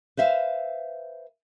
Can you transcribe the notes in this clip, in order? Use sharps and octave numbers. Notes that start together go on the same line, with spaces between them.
B4 C5 E5 F5